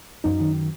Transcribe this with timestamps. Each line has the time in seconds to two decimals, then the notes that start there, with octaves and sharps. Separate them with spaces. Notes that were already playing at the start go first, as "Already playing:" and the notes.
0.24 F#2 D#4
0.40 D#3